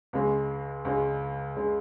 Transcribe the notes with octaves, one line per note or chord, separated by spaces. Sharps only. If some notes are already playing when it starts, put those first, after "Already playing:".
C#2 C#3 G#3
C#2 C#3 G#3
C#3 G#3